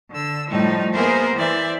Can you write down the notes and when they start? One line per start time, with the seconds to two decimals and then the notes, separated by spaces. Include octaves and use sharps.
0.11 D3 E6
0.50 A2 F3 G3 D#4
0.93 A#3 B3 G#4 A#4 C5 E5
1.36 E3 C5 D5 E5